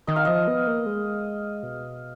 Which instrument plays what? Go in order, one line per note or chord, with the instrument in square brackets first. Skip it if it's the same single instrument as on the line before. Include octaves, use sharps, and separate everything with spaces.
[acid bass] D#3 [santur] D#5
[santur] F5
[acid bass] F3 [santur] D#5
[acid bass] B3
A#3
G#3
B2